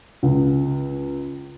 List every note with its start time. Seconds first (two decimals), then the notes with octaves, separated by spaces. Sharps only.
0.23 C#2